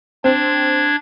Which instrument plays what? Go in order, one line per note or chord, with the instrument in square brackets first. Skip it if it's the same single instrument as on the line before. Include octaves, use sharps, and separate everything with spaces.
[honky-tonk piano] C4 [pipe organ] D4 G#6